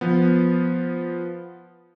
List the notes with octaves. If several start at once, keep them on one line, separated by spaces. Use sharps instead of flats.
F3 B3